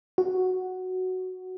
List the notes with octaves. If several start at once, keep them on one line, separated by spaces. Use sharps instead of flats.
F#4